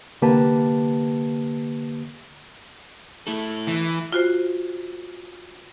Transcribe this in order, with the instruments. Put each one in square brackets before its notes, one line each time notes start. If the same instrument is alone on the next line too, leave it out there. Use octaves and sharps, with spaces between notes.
[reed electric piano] C2 D3 A#3 G4 B4 A5
[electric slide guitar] A3 E4 A4
[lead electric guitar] E3
[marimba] F4 F#4 C5